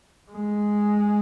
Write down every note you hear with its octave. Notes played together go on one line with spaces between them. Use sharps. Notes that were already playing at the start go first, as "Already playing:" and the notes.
G#3